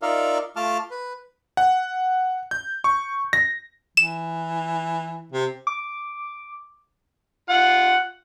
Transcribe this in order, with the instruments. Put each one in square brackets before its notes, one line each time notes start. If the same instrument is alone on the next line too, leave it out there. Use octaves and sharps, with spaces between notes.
[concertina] D#4 F4 A#4 D5 E5 F5
A3 F4 A5 D6 F6
B4
[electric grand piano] F#5
G6
C#6
A#6
[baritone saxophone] E3 [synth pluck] E7
[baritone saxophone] C3
[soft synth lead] D6
[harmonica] F4 F#5